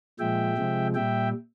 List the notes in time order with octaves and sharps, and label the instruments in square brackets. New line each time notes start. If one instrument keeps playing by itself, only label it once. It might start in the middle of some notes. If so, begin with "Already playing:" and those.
[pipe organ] A#2 F3 G#3 E5 G5
C3 F3 G#3
A#2 G3 E5 G5